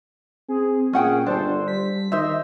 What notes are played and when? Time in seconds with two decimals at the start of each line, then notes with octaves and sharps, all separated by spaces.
0.49 C4 G#4
0.93 A#2 C#4 G#4 F#5 G5
1.26 G1 D4 A4 C5
1.68 G3 B6
2.12 D#3 C5 D#5 E5